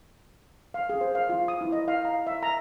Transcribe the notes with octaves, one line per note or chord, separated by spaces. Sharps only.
F5
G#4
C5
F5
F4
D#6
E4
D#5
F5
A#5
E5
A#5